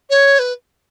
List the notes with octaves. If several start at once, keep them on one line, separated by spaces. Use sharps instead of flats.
C#5
B4